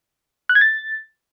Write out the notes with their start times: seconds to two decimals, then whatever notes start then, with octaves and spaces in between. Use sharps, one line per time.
0.49 F#6
0.55 G#6
0.61 A6